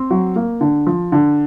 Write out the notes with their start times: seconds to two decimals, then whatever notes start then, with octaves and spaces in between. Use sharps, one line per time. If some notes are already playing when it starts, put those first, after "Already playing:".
Already playing: C4
0.10 F#3
0.36 A#3
0.61 D3
0.87 F3
1.12 D3